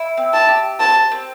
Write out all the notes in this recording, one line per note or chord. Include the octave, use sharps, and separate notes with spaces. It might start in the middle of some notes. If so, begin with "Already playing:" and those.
Already playing: E4
C4
A5
G4
C5 A5
C4